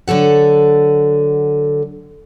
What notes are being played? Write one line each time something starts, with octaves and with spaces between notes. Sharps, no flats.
D3 F#3 A4 F#5